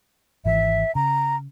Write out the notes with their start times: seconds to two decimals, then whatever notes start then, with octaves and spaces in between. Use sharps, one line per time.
0.45 G#1 E3 E5
0.95 C#3 A#5